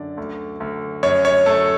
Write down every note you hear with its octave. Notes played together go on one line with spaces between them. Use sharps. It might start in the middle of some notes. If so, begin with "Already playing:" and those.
Already playing: F#2 D3 D5
D2
D2
F#2 C#5
C#5
A3 A4